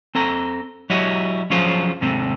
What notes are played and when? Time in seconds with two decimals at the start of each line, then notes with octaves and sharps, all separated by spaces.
0.15 C4 A4 A#5
0.90 F#3 E4 F#4 G4 D#5
1.50 F3 F#3 C#4 F4 G#4 C5
2.01 D#2 G#2 C3 A3 C4